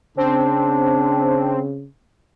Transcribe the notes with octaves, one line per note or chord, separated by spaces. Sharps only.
C#3 C4 D4